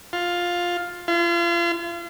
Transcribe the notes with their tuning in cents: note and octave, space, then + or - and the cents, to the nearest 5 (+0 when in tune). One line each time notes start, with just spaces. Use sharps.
F4 +10
F4 -35